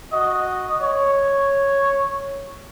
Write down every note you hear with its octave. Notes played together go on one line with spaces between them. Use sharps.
F#4 D#5
C#5